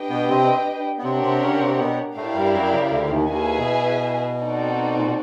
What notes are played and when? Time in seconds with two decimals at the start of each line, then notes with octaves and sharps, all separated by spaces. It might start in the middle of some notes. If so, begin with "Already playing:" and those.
Already playing: D4 G4 B4 D#5 G5
0.10 B2 B3
0.29 C3 C4
0.99 B3
1.03 C3 C4 D4 G4 A#4 C#5 F#5
1.22 C3 C4
1.42 C#3 C#4
1.60 C3 C4
1.78 B2 B3
2.16 A2 A3 E4 G4 A#4 D5 F5
2.35 G2 G3
2.53 F#2 F#3
2.73 C#3
2.91 D2 D3
3.10 D#2 D#3
3.29 D#2 D#3 E4 G#4 B4 E5 G#5
3.58 B2
4.41 C4 D#4 F#4 A4 D5
4.98 A#2
5.05 B2